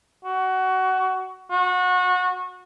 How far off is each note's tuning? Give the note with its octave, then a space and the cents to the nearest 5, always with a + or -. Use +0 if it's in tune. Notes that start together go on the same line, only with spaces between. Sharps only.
F#4 +20
F#4 -25